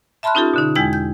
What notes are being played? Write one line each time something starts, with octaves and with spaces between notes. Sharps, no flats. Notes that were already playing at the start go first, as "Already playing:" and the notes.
E5 A5 B5 C6 F6 F#6
C#4 D#4 F4 G4 A4
B2 D3 D#4
E2 G#3 E4 G5 G#6
G6